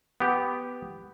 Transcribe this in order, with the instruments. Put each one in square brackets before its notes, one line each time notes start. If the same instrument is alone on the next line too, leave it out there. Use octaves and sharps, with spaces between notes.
[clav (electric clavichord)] B3 G4